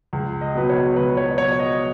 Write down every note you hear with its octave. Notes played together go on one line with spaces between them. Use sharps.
C#2
D#5
B2 F#3 B4
C#5
C#2 B4
B4
C#5
B2 F#3 C#5
D#5